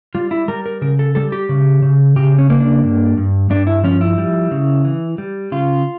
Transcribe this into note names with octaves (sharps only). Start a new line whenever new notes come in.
G3 F4
E4
G3 A#4
A#4
C#3 A#4
A4
G3 A4
G4
C#3
C#3
C#3 G4
C#4
A#3
D4
G2
G2
G2 D4
E4
F3 C#4
E4
G3
C#3
E3
G3
C#3 F4